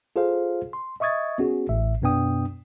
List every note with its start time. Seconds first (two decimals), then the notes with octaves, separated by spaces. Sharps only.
0.16 F4 G#4 A4 C5 F5
0.73 C6
1.00 D#5 E5 C#6 D#6 G#6 A6
1.38 B3 C#4 F#4 G#4
1.69 A1 A2 E5
2.02 F#2 B2 B3 D4 G5 D#6